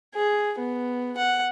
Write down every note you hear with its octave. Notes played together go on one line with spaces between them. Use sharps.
G#4
B3
F#5